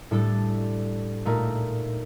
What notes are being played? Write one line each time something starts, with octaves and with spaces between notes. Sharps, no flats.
A2 G3 D4 A4
A#2 A3 D#4 A#4